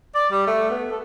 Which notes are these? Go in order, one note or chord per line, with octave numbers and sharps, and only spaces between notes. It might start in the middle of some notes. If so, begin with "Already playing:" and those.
D5
G3
A3
B3
A4